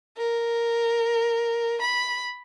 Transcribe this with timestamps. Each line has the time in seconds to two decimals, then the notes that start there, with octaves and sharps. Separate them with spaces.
0.17 A#4
1.81 B5